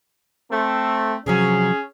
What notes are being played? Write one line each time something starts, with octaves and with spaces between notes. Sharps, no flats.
A3 C4
C3 F3 F#3 C#4 G#4